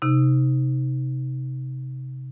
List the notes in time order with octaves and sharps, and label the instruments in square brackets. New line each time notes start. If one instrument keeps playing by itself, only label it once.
[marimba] C3 D#4